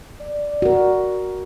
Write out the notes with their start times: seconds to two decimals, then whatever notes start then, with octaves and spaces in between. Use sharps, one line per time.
0.21 D5
0.62 F#4 A#4